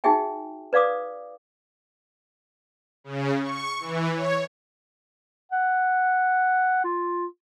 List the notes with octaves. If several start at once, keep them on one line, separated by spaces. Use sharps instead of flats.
D#4 F#4 G#4 E5 G5 G#5
B4 D5 F5 D6 D#6
C#3
C#6
E3
C#5
F#5
F4